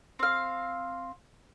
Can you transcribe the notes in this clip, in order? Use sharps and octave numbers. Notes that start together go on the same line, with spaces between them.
C4 F5